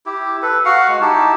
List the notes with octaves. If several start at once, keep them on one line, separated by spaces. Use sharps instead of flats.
E4 G4
A4 B4
F#4 F5 F#5
G#3 F#4
D#4 E4 G4 A5